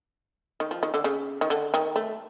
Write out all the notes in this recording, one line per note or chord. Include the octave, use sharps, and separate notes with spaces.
D#3
F3
D#3
D3
C#3
D#3
D3
D#3
A3